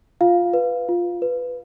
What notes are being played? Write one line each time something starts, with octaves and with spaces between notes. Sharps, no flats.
F4 F5
B4
F4
B4